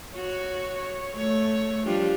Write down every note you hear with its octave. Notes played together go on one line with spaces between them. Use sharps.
F#4 C#5
A3 C#5
F3 G3 D4 F4 G4